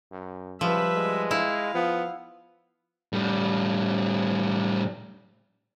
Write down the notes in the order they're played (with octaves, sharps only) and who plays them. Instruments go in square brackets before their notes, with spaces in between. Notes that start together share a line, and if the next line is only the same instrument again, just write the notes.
[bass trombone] F#2
[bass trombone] C#2 [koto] F3 [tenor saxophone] G3 [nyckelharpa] B4 E5
[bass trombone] G#3
[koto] E4 [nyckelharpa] F5
[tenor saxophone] F3 [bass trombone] B3
[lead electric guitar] A2 G3